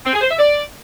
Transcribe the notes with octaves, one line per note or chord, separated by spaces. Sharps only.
C4
G#4
C5
E5
D5